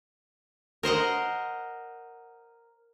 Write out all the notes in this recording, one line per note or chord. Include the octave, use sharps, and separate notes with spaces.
A#4 C5 D#5 F#5